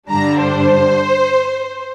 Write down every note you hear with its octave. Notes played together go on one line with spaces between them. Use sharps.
G2 D3 G3 D4 A#5
C5